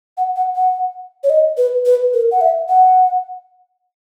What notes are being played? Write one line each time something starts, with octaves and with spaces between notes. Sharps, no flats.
F#5
F#5
F#5
C#5
D#5
B4
B4
A#4
F#5
E5
F#5